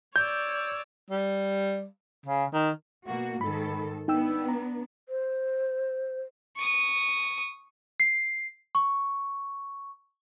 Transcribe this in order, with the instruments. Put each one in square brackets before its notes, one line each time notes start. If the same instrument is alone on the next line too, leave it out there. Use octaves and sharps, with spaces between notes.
[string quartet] C#5 D5 E6 [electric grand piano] G6
[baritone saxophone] G3
C#3
D#3
[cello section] B2 A#3 F#4
[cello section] G#2 D#3 A4 [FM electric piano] B5
[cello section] B3 D4 [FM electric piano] D#4 G5 E6
[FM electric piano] A#5
[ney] C5
[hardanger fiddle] C#6 D#6
[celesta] C7
C#6